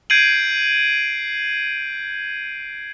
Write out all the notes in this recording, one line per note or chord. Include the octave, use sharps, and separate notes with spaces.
G6 G#6 C7 D7 D#7 F#7